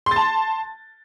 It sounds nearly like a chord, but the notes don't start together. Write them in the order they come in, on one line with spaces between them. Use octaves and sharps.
C6 A6 A5